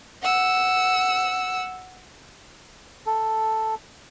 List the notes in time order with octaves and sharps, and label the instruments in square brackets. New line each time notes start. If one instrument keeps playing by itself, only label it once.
[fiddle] F#5 E6
[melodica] A4